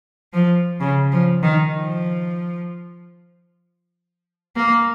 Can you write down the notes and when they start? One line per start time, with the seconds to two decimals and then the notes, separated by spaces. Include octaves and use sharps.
0.33 F3
0.80 C#3
1.12 F3
1.43 D#3
1.75 F3
4.56 A#3